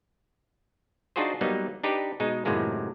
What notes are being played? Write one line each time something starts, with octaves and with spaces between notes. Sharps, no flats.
D4 D#4 F4 F#4 G#4 C5
F#3 G3 A#3 B3 D#4
D4 D#4 G4 B4
B2 G#3 D#4
F#2 A2 C3 D#3 G#3 A#3